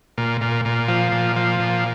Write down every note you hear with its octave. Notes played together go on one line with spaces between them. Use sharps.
A#2
A#2
A#2
F3
A#2
F3
A#2